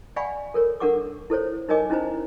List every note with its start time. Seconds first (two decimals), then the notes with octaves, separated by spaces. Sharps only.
0.16 D5 F5 F#5 G#5 B5 C#6
0.54 A4 A#4 C#5
0.80 D4 A4 A#4 F#5 C#6 D6
1.30 E4 A4 C5 C#5
1.69 D#4 A#4 C#5 D#5 G#5 D6
1.90 C#4 D#4 E4 C5 A#5